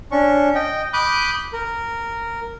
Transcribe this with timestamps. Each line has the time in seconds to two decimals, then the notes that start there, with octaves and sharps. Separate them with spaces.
0.11 C#4 D4 C#6
0.55 D#5 G5
0.93 B5 D6 D#6 F#6 G6
1.53 A#4